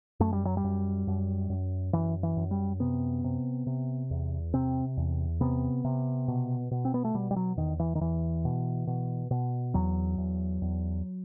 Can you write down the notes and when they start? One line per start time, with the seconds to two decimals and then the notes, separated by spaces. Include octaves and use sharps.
0.20 F#2 A3
0.33 G3
0.45 F#3
0.57 G3
0.64 F#2
1.07 F#2
1.50 F#2
1.93 F#2 E3
2.23 E3
2.37 F#2
2.51 G3
2.80 C3 B3
3.24 C3
3.67 C3
4.11 E2
4.54 C3 C4
4.97 E2
5.41 C3 B3
5.84 C3
6.28 B2
6.71 B2
6.85 C4
6.94 B3
7.05 A3
7.14 B2 G3
7.31 G3
7.36 F#3
7.57 E2 D#3
7.79 E3
7.95 D#3
8.01 E2 E3
8.45 B2
8.87 B2
9.31 B2
9.74 E2 F#3
10.18 E2
10.62 E2